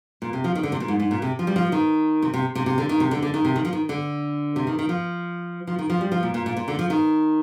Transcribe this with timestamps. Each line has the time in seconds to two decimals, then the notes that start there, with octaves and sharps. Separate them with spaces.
0.22 A#2
0.33 C3
0.44 F3
0.55 D#3
0.63 D3
0.72 C3
0.80 A#2
0.88 G#2
0.99 G#2
1.11 A#2
1.22 C3
1.39 F3
1.47 G3
1.56 F3
1.72 D#3
2.22 C3
2.34 C3
2.55 C3
2.66 C3
2.78 D3
2.89 D#3
3.00 C3
3.11 D3
3.22 D3
3.34 D#3
3.45 C3
3.56 D#3
3.65 F3
3.73 D#3
3.89 D3
4.56 C3
4.67 D#3
4.79 D#3
4.89 F3
5.67 F3
5.79 D#3
5.90 F3
6.01 G3
6.12 F3
6.23 A#2
6.34 A#2
6.46 A#2
6.57 A#2
6.68 D3
6.79 F3
6.90 D#3